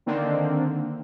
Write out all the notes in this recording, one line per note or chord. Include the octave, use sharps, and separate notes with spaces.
D3 D#3 A#3 C4 D4